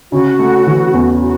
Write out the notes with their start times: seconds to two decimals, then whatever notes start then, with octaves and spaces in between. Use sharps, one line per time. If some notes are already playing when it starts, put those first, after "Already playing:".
0.12 C#3 F#4
0.39 A3
0.67 E3
0.94 E2
1.21 F#4